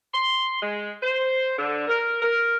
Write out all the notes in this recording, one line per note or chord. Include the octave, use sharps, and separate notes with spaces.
C6
G#3
C5
D3
A#4
A#4